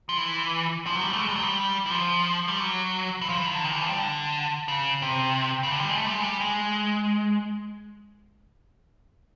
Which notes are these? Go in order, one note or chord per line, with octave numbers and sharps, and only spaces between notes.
F3
E3
F3
F#3
G3
A3
G#3
G3
F#3
G3
E3
F3
G3
F#3
E3
F3
E3
D#3
D3
D#3
E3
F3
G3
D3
C#3
C3
C#3
D3
G3
G#3
A3
G3
G#3
G3
G#3